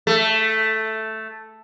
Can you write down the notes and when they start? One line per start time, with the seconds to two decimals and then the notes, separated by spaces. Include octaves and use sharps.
0.07 A3